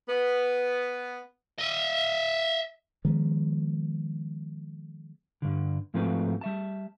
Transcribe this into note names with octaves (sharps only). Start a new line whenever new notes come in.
B3
D#5 E5
D#3 F3 G#3 B3
G2 D3
G#2 F3 A3 C4 F#4 B4
G3 E5 A5